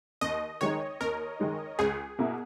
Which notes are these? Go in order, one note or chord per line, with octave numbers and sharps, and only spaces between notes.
D#2 D#5
D#3 G#3 D#4 C#5
D#2 A#4
D#3 G#3 D#4
C#2 G#4
B2 A#3 E4